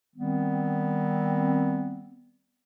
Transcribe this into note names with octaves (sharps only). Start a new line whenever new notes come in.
D#3 G3 B3 C4